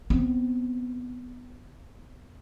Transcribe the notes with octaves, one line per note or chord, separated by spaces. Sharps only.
B3 C4